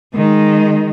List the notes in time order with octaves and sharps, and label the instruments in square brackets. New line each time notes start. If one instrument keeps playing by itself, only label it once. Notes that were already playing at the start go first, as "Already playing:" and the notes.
[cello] D#3 G#3